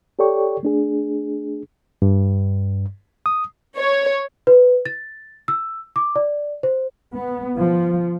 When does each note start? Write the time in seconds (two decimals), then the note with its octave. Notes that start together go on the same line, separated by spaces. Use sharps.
0.19 G4 A4 C#5 D5 G5 C#6
0.63 A3 D4 G#4
2.02 G2
3.26 D#6
3.77 C#5
4.47 B4
4.86 A6
5.48 E6
5.96 D6
6.16 D5
6.63 C5
7.15 B3
7.59 F3